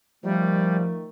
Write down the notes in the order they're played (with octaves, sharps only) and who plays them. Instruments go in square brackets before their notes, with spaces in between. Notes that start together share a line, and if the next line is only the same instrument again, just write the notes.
[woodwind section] D#3 A3 [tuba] F3 [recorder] G3